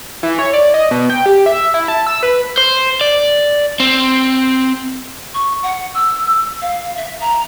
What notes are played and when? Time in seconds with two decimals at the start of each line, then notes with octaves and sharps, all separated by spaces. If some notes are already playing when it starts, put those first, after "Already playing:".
0.23 E3
0.39 C#5
0.53 D5
0.74 D#5
0.91 B2
1.10 G5
1.26 G4
1.46 E5
1.74 E4
1.88 A5
2.07 E6
2.23 B4
2.57 C5
3.01 D5
3.80 C4
5.34 C#6
5.63 F#5
5.95 E6
6.62 F5
6.97 E5
7.21 A#5